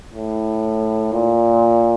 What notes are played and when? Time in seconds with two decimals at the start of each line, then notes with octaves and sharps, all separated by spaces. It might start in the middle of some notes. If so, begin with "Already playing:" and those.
0.13 A2
1.13 A#2